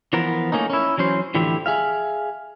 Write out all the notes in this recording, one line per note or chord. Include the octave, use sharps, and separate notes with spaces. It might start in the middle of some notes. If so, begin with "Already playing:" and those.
E3 F3 B3 A#4
A3 A#3 C#4 D#4
C#4 E4
E3 F#3 C#4 C5
A2 D3 E3 F3 E4 G4
G#4 E5 F5